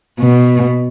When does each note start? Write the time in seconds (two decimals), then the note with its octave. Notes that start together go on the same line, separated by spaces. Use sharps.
0.20 B2